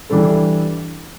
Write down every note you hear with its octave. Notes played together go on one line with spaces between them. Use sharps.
E3 G3 D4 A4